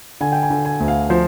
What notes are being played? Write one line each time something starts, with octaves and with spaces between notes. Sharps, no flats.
D3 G#5
G5
G#5
D3
G#5
D2
F5
F3 C5